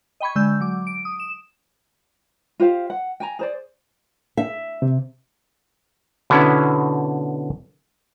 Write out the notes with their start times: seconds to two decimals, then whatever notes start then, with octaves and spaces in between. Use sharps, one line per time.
0.20 D#5 G5 B5 C#6 G#6
0.35 D3 G#3 E6 G6
0.61 F#3 D6
0.87 D7
1.05 D#6
1.20 E7
2.60 F4 G4 C5 F5
2.90 F#5
3.20 G5 G#5 A#5
3.39 G#4 C5 D5
4.37 E5
4.82 C3
6.30 B2 D3 B3 C#4 E4